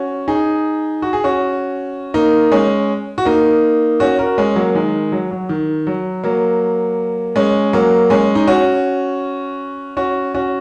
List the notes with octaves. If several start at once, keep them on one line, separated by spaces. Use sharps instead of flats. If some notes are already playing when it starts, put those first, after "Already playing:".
Already playing: C#4 F#4
D#4 G#4
F#4
G#4
C#4 F#4
A#3 D#4
G#3 C#4
F#4
A#3 D#4
C#4 F#4
F#4 A#4
G#3 C#4
F#3 A#3
D#3 G#3
F#3
F#3
D#3
F#3
F#3 A#3
G#3 C#4
F#3 A#3
G#3 C#4
D#4
C#4 F#4
C#4 F#4
C#4 F#4